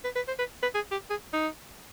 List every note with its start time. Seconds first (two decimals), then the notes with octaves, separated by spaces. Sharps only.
0.04 B4
0.16 B4
0.28 C5
0.39 B4
0.63 B4
0.74 G#4
0.91 G4
1.10 G#4
1.33 D#4